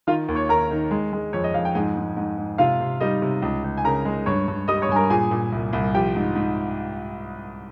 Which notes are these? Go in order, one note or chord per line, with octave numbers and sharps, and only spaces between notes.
D#3 F4 F5
D#2
C#5 C#6
D#2 A#4 A#5
D#3
G#3
G#3
F2 C#5
D#5
F2 F5
G5
G#2 G#4 G#5
G#2
G#2
G#2
C3 F4 F5
C3
G3 D#4 D#5
C3
C#2
C#2
G#5
C#3 A#4 A#5
G#3
G2 C#5 C#6
G2
G3 D#5 D#6
C#5 C#6
G2 G#5
A#4 A#5
A#2 G#4 G#5
A#2
C2
C2
F3 G4 G5
G#2
G#2